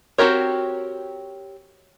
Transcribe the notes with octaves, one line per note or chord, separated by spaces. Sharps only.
C4 F#4 G4 A#4 C#5